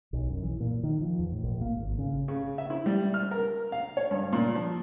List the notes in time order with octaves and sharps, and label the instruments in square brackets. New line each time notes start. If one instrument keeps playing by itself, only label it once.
[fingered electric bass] B1
F#2
E3
A#2
D#3
F3
E2
A2
A#1
A#3
G#1
C#3
[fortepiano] C#3
E5
E4
G3
F6
A#4
F5
C#5
G2
A#2
F3